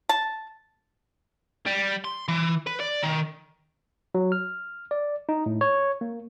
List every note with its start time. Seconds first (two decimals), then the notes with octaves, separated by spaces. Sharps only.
0.09 A5
1.67 G3
2.04 C6
2.28 E3
2.67 B4
2.80 D5
3.03 D#3
4.15 F#3
4.32 F6
4.91 D5
5.29 D#4
5.46 A2
5.61 C#5
6.01 A#3